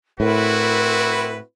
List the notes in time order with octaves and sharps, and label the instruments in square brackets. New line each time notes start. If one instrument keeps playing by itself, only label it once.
[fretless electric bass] A2 [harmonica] C4 E4 B4 [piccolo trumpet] F#4 [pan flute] A#4